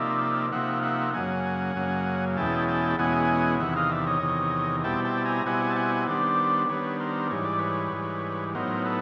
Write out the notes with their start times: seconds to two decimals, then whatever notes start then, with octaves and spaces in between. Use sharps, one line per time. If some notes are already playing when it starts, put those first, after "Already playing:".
Already playing: C3 F3 A#3 D#4 D5 E5
0.52 C3 F3 A#3 D#4 E5 F#5
0.83 E5 F#5
1.14 F#2 C#3 F#3 A#3 F#5 G#5
1.76 F#2 C#3 F#3 A#3
2.37 E2 B2 G#3 C#4 E4 G5 A5
2.68 G5 A5
2.99 E2 B2 G#3 C#4 E4 F#5 G#5
3.60 E2 C3 D#3 E5 F#5
3.76 D#5 F5
3.91 D5 E5
4.06 C#5 D#5
4.22 E2 C3 D#3
4.84 B2 G3 C4 E4 G5 A5
5.04 G5 A5
5.25 G#5 A#5
5.45 B2 G3 C4 E4 F#5 G#5
5.70 A5
5.76 F#5 G#5
6.07 D#3 G3 B3 D4 C5 D5
6.69 D#3 G3 B3 D4 B4 C#5
7.00 A#4 C5
7.31 G#2 E3 G3 C#5
7.45 D5
7.59 B4 C#5
7.92 G#2 E3 G3
8.55 A2 F#3 B3 D#4 A#4 C5
8.85 A4 B4